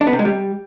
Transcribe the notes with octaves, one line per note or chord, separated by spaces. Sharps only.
D4
B3
C3
G#3
G3